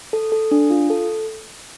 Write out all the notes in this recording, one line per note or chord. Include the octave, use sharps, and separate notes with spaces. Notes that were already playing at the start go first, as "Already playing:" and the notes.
A4
A4
D4
F4
A4